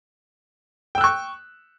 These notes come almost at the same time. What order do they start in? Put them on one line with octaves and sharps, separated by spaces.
G5 E6 F#6 C#6